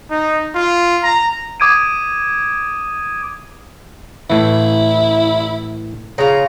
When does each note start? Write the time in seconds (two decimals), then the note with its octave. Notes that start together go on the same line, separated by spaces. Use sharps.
0.11 D#4
0.55 F4
1.04 A#5
1.60 D6 D#6 G#6 D7 D#7
4.30 A2 E3 E4
6.18 C#3 F4 A#5